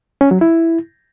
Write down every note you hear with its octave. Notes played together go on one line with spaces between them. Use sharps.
C#4
F#3
E4